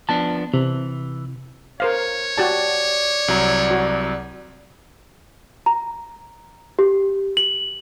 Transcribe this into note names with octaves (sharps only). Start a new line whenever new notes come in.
F3 B3 D4 A5
C3 E3
A#4 C5 C#5 F5
F#4 G4 D5 A5
C2 F#3 A#5
F#4
A#5
G4
F#7